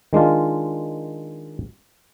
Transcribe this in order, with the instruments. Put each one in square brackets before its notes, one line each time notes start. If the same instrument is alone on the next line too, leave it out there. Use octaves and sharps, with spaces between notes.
[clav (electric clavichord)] D#3 G#3 D4 F4